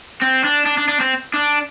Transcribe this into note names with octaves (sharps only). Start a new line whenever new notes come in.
C4
D4
D4
D4
D4
C4
D4